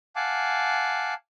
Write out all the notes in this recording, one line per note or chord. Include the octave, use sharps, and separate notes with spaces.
F5 F#5 G#5 A5 D6